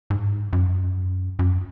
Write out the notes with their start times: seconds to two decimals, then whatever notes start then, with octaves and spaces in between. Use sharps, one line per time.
0.10 G#2
0.53 F#2
1.39 F#2